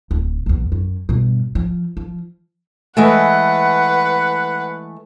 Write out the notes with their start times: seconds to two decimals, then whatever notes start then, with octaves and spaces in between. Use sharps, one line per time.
0.11 D1
0.46 A#1 E2
0.72 F#2
1.09 G2 B2
1.55 F3
1.97 F3
2.97 E3 G#3 A3 B4 F#5